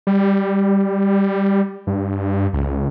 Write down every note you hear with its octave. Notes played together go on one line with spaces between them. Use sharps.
G3
G2
C#2